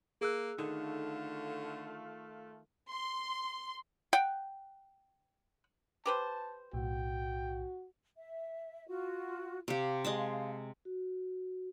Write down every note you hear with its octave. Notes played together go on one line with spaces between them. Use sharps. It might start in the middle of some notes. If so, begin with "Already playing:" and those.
A#3 G#4 E6 F#6
D3 D#3 A3 F4 F5
C6
F#5 G5
G4 B4 C5 A5
B1 A2 F#4 G5
E5
F4 F#4
C3 G4 F5
G#3 D#5 A5
F#4